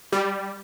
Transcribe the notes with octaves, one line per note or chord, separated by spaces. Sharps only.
G3